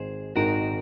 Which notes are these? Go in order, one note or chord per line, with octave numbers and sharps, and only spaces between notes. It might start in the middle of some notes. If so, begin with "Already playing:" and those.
Already playing: G#1 G#2 D#3 G#4 C5
G#1 G#2 D#3 F#4 A#4